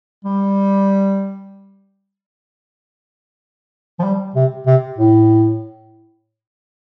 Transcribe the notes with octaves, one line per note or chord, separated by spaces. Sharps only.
G3
F3
G3
C3
C3
A2